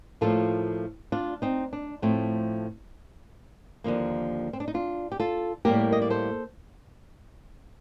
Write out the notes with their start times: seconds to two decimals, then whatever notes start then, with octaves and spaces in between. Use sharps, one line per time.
0.21 A2 F3 A#3 F4 A4
1.12 D4 F4
1.42 C4 D#4
1.73 D4
2.02 A2 F3 A3 C4
3.84 D#2 D3 F3 A#3
4.53 C4
4.60 D4
4.68 D#4
4.74 D4 F4
5.12 G4
5.20 F4 A4
5.65 A2 G3 A#3 G4 A#4
5.92 D#5
6.02 D5
6.10 A4 C5